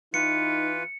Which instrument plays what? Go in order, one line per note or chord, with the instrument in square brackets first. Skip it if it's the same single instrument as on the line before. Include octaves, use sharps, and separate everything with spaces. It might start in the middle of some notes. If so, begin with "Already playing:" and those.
[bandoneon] E3 F4 B4 [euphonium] D#4 [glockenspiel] C#7